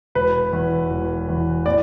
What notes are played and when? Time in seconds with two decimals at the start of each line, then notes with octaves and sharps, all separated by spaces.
0.15 E1 B4
0.53 E2 E3
0.90 E1
1.28 E2 E3
1.66 A2 D5